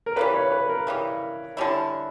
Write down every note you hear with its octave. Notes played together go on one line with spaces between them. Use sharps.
A#4
C#3 E3 G3 B4
C#5
B4
A#4
C#3 E3 G3
D3 G3 C#4 E4